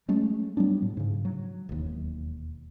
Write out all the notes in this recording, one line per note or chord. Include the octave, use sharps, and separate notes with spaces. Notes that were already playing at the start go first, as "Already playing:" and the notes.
F#3 G#3 A3 C#4
F#3 G3 B3 D4
A2
G#2 C#3
F#3
E1 D#2